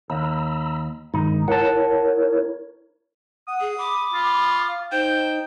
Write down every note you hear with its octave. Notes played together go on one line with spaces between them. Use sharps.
D#2 A#5 B5 E6
G2 D#3 G#3 D#4
E4 A#4 C#5 F#5 A5
F#5 D#6
G#4
B5 D6
F4
F5
D#4 C5 G5